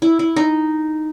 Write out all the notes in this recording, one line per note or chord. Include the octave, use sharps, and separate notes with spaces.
E4
E4
D#4